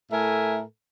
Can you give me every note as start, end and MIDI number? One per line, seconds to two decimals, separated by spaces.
0.11 0.61 45
0.11 0.61 57
0.11 0.61 69
0.11 0.61 70
0.11 0.61 76
0.11 0.61 80